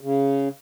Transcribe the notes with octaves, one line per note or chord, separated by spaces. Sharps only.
C#3